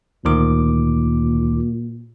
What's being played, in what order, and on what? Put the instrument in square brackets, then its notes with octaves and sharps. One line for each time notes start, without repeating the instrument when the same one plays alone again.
[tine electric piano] D2 D#3 D6 [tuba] A#2